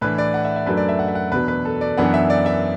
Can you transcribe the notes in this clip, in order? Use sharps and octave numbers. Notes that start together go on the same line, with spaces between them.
A2 E3 D4 B4
D5
F#5
E5
E5
F#2 F#3 A3 D4 B4
D5
E5
F#5
E5
F#5
E2 B2 F#3 D4 B4
B4
A4
D5
F#2 E3 B3 D4 F#5
E5
D5
E5